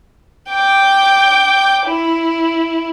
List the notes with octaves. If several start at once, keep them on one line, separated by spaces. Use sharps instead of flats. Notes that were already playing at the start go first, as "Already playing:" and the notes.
G5 D6
E4